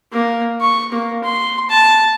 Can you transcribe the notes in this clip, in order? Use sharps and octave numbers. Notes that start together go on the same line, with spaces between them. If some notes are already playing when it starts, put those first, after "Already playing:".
A#3
C#6
A#3
C6
A5